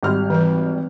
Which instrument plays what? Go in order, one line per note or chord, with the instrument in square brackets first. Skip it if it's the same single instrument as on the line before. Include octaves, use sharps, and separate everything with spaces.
[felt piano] G#1 G3 F6
[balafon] E3 B4